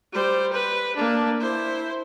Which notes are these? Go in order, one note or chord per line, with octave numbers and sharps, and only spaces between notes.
G3 C5
B4
A#3 D4
E4 C5